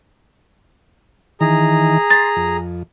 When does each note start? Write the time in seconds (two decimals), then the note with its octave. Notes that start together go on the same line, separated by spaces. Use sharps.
1.41 D#3 E3 G#4 A#5
2.10 C6 A6
2.36 F2